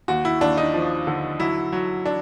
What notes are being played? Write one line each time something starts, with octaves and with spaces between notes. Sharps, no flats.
D#2 F#4
E4
D#2 D4
D#4
F3
D3
F#3 E4
F#3
D4